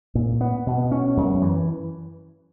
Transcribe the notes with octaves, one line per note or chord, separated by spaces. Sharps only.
A#2
B3
B2
C#4
F#2
E3